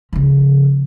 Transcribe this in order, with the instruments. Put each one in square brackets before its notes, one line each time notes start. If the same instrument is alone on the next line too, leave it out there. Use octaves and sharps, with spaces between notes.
[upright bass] C#3 F3